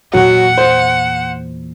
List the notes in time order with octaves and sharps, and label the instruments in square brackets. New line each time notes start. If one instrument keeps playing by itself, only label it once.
[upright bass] E2 A#2 [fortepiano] F#3 F#4 [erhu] F#5
[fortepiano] C5